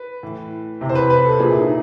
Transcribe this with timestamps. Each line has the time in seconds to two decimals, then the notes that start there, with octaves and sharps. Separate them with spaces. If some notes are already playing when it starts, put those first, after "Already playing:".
Already playing: B4
0.23 A2 E3
0.81 C3 E3
0.89 C5
0.95 B4
1.10 B4
1.25 A4
1.39 A#2 F3 G#4
1.51 E4
1.60 D#4